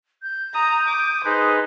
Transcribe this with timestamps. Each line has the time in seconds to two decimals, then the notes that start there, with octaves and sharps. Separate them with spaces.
0.23 G6
0.54 A#5 D#6
0.88 D6
1.25 D#4 G#4 B4 C5